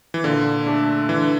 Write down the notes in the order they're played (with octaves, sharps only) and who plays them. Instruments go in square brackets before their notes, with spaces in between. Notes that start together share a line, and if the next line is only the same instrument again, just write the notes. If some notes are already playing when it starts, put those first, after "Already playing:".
[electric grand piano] E3
[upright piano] A#2 [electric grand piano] D3
[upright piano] A3 D4
[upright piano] D3 [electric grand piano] E3